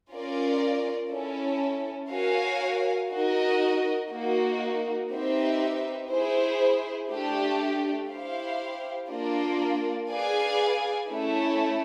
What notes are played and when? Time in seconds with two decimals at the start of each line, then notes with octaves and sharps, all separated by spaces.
0.11 C#4 F4 A#4 D5
1.10 C#4 E4 A4
2.10 F#4 A#4 C#5 F5 G#5
3.10 D#4 F#4 A#4 D#5
4.10 A#3 D#4 F#4
5.10 C4 D#4 G4 B4 E5
6.10 E4 G#4 C5
7.09 A3 D4 G4
8.09 E4 G4 C5 F5
9.09 A#3 D4 F4 A#4 D5
10.09 G#4 B4 D5 F5 G#5
11.09 A3 C#4 E4 A4